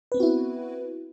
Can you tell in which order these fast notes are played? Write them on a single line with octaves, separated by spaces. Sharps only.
B4 C4 B3 F#4 E4